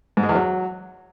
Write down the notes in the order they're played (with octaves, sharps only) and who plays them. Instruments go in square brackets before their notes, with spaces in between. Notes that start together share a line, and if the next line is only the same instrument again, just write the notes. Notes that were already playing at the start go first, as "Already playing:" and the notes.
[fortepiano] G#2
G#3
E2
F#3